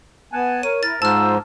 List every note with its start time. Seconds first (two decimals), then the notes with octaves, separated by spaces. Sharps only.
0.33 B3 F#5 G#5 A5
0.63 A#4 C#5 D#7
0.83 E4 A#4 A6
1.02 G#2 F3 F4 C5 A5 E6 F6